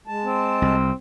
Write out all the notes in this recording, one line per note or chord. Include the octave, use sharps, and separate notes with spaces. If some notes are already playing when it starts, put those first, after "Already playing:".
G#3 A5
C4
C2